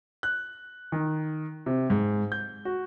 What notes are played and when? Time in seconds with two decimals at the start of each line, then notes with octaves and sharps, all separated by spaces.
0.23 F#6
0.92 D#3
1.66 C3
1.90 G#2
2.32 G6
2.65 F#4